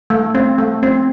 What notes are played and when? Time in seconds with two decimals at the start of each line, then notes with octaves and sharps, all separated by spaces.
0.10 A3
0.35 C4
0.58 A3
0.83 C4